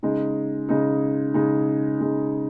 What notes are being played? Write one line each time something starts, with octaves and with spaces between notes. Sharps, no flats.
C#3 G#3 D#4
C#3 G#3 D#4
C#3 G#3 D#4
C#3 G#3 D#4